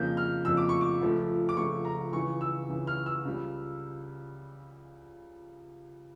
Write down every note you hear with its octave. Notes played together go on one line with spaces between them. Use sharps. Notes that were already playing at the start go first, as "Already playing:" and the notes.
Already playing: F2 C#3 F3 A#3 G6
F6
F2 C#3 F3 A#3 E6
D6
C#6
D6
C#2 C#3 F3 A3
D6
C#2 C#3 F3 A3 C#6
A#5
C#2 C#3 E3 C#6
E6
C#2 C#3 E3
F6
E6
C#2 C#3 G3